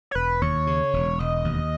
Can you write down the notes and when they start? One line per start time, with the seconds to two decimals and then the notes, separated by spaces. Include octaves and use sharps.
0.11 C#5
0.15 E1 B4
0.42 D#2 C#5
0.67 C#3
0.93 E1
1.19 E1 D#5
1.44 D#2